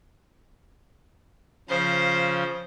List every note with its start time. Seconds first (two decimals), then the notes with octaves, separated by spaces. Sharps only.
1.69 C#3 F3 C5